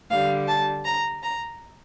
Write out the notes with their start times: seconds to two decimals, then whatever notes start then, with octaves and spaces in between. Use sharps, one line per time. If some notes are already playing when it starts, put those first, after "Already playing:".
0.11 D3 G3 F5
0.48 A5
0.86 A#5
1.23 A#5